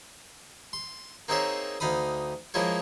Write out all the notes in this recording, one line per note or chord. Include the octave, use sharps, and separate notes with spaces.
C6
A#3 C4 D#4 G#4 C#5 E5
D2 D#4 F5 B5 D#6
F3 G#3 A#3 E4 F4 C#5